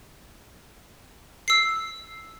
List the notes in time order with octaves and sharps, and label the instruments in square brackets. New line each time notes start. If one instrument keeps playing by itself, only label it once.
[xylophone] E6 C7